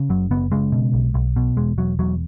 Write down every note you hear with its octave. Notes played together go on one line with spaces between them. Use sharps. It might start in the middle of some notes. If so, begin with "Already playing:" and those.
Already playing: C#3
F#1 F#3
F#1 B3
C#3 G#3
B2
B1
B1
B2
E1 G#3
E1 F#3
E2 F#3